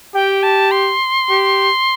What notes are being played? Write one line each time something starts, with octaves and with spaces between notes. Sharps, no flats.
G4 G5
A5
C6
G4